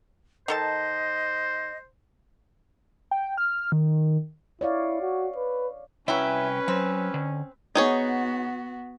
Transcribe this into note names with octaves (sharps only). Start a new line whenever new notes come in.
D#3 A4 C5 D#5 A5
G5
F6
D#3
E4 C#5 D5 F5
F#4
B4
C2 F#3 C#4 E4 B4 G5
F#3 C4
D3
B3 D#4 F#4 G#4 C#5